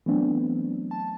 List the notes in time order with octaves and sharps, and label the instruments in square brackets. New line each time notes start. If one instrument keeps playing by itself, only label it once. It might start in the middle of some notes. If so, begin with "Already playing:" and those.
[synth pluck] E3 F#3 A3 B3 C4 D4
A5